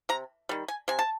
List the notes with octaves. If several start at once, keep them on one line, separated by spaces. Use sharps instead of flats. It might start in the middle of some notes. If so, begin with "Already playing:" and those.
C3 A#5
D#3 G3
G#5
C3 G#5
A5